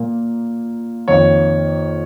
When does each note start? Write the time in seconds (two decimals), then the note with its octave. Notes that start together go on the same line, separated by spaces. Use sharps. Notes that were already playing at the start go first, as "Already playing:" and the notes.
Already playing: A#2 A#3
1.08 F2 D#3 A#3 C#5